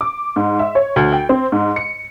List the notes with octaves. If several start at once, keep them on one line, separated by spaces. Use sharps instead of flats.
D6
G#2
E5
C#5
D2
G5
C4
G#2
C#7